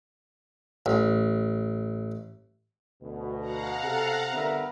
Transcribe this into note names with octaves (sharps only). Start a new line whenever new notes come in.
A1
D2 B2
F5 F#5 A#5
C3 A4
G2 D3 B3 A#4 E5